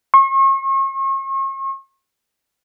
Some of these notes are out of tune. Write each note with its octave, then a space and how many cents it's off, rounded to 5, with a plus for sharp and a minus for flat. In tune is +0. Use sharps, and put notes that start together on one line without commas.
C#6 -40